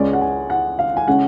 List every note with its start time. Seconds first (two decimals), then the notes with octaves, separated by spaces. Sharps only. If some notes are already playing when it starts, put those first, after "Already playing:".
Already playing: C#2 C#3 G#3 C#4 D5
0.13 F#5
0.21 G#5
0.50 F#5
0.79 F5
0.97 G#5
1.08 C#3 G#3 C#4 F#5